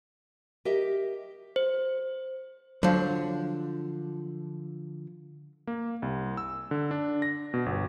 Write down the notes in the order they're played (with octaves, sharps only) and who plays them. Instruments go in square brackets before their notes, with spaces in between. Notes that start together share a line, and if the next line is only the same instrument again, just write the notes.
[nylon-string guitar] G4 A#4 D#5 E5
[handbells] C5
[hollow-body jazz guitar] D3 F3 [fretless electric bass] F#3
[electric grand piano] A#3
C2
E6
D3
D4
A#6
B2
G1